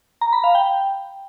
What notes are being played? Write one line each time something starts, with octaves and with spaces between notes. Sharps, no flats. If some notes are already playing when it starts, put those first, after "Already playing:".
A#5
B5
F5
G5